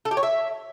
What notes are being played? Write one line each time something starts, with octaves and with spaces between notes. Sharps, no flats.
A4
G4
C#5
E5